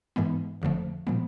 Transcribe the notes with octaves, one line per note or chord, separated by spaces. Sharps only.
G#2 E3 G#3 B3
G1 F2 D3 F3 A3
A#2 F3 G#3 B3